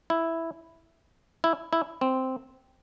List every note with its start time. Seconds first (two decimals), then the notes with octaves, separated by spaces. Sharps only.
0.10 E4
1.44 E4
1.73 E4
2.01 C4